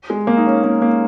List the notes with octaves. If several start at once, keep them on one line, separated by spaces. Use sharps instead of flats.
G#3
A#3
D#4
C#4
A#3
A#3